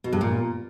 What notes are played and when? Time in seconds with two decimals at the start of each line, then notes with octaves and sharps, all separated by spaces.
0.04 B2
0.13 G2
0.21 A#2